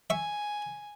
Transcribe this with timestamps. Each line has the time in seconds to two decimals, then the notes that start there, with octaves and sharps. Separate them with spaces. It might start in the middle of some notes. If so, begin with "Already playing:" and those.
0.10 E5 G#5 C#6